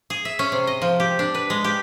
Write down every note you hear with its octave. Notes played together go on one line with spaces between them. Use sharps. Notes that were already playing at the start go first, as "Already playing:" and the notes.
G#4
E5
C#4
C3
D#5
F3
G4
D4
B4
G#3
G4